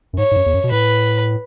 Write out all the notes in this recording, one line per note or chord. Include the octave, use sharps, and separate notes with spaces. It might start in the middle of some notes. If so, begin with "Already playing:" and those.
F#2
G#2 C#5
G#2
F#2
E2
F#2
B2
A2 B4